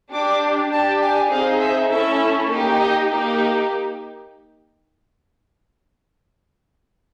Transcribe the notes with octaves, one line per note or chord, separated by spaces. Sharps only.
D4 G4 D6
D4 G4 A5
G#5
C4 D#4 G#4 F5
E5
A3 C#4 E4 A4 E5
A#3 D#4 G4
D#5
A#3 D#4 G4